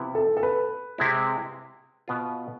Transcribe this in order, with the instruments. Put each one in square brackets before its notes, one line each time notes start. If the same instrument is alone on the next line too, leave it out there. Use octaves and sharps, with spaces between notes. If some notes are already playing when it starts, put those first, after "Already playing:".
Already playing: [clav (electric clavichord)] C3 F3 B3 E4
[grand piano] A4
A4
B4
[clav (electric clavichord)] C3 G#3 C4 E4
B2 B3 F4